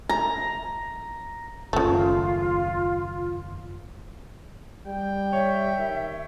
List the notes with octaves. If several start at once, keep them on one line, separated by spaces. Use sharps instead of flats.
A#5
F#1 D#2 C#3 A3 F4
G3 G5
C#5 E5
D#3